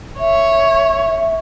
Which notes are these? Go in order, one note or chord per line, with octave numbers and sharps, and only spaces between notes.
C#5 E5